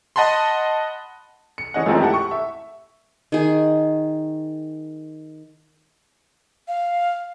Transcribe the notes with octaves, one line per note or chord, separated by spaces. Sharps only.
D#5 F#5 A5 B5 C6
C#7
E3 C#4 D#5 F#5
F#2 E3 F3 G#3 A3 C4
E4 G4 A4 F#5
C#6
E5
D#3 G#4
F5